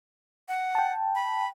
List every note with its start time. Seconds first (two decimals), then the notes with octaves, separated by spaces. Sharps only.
0.48 F#5
0.75 G5 A5
1.15 B5